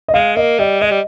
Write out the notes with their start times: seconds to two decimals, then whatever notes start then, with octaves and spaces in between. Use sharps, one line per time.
0.08 D#5
0.14 G#3 F5
0.36 A#3 D#5
0.59 G3 D#5
0.81 G#3 D#5
0.91 G3